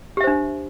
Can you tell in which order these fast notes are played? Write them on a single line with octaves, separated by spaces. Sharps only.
G4 E5 C5 D4